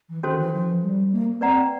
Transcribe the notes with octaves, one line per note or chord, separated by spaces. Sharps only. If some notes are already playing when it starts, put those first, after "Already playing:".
E3
D#3 C#4 F#4 A4 C5
E3
F3
G3
A#3
C4 B4 D5 F#5 A#5